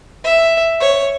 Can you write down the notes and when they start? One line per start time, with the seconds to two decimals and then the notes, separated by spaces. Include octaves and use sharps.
0.24 E5
0.80 C#5